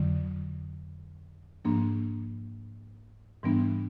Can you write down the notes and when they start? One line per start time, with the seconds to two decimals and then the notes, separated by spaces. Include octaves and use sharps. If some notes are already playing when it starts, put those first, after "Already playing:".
Already playing: F2 D3 F#3
1.65 G#2 F3 A#3 D4
3.43 G#2 E3 G3 B3 D4